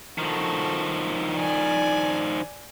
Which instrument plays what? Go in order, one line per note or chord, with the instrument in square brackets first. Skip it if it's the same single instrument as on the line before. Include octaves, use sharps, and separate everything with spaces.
[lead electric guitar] D#3 F3 [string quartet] F#4 A4
[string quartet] D5 G#5